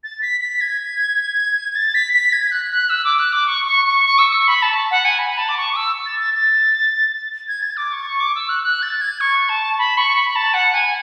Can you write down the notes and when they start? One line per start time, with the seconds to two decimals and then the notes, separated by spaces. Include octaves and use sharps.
0.04 A6
0.21 B6
0.41 B6
0.61 G#6
1.75 A6
1.95 B6
2.13 B6
2.32 G#6
2.51 F#6
2.71 F#6
2.89 E6
3.04 D6
3.19 F#6
3.32 D6
3.47 C#6
3.66 C#6
3.86 C#6
4.05 C#6
4.18 E6
4.33 C#6
4.48 B5
4.62 A5
4.91 F#5
5.05 G#5
5.19 B5
5.38 A5
5.48 D6
5.57 C#6
5.72 D6
5.76 E6
6.06 A6
6.20 A6
6.34 A6
7.48 G#6
7.62 A6
7.77 D6
7.92 C#6
8.05 C#6
8.20 D6
8.35 E6
8.49 F#6
8.63 F#6
8.82 A6
9.01 G#6
9.20 C#6
9.49 A5
9.78 B5
9.98 C#6
10.16 B5
10.36 A5
10.54 F#5
10.74 G#5